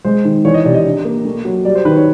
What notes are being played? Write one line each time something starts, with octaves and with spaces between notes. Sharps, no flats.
G#3 C5
D#3
E3 C#5
D#5
C3 D5
D#5
D4
A#3
A3
F#3
G3 D5
C5
D#3 B4
C#5